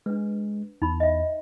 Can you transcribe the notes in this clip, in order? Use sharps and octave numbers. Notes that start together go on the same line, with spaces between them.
G#3 D4 B4
E2 D#4 B5
D#5 E5